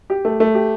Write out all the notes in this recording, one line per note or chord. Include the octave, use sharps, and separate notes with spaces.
G4
A3
A3
G4